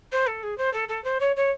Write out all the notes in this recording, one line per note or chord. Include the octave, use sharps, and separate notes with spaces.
C5
A4
G#4
C5
A4
A4
C5
C#5
C#5